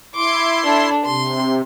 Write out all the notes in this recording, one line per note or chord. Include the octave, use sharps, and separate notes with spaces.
E4 C6 D6
D4 A4
C3 C6